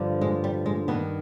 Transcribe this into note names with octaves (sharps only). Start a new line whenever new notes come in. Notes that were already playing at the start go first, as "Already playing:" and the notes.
Already playing: G2 D3 F3
G#3
G3
G#3
G2 D#3 B3